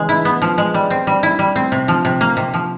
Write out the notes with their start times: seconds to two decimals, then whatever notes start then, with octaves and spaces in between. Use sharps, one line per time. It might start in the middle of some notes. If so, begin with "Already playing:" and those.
Already playing: C#3 E3 G#3
0.09 E4
0.25 B3
0.42 F3
0.58 G#3
0.74 G3
0.90 C4
1.07 G3
1.23 E4
1.39 G3
1.56 C4
1.72 C3
1.88 F3
2.05 C3
2.21 A#3
2.37 C3
2.54 F3